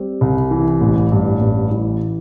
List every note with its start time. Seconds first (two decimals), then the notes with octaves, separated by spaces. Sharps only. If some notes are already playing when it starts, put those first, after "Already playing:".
Already playing: G3 C4
0.21 C2
0.51 E3
0.81 A1
1.12 G2
1.41 A1
1.71 E3